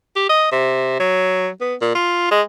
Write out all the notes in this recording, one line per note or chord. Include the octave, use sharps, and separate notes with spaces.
G4
D#5
C3
F#3
B3
A#2
F4
G#3